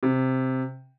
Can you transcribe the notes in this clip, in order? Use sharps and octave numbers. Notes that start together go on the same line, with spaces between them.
C3